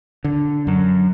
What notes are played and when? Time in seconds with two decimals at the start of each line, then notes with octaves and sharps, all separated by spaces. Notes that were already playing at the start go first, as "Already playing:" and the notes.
0.24 D3
0.67 F#2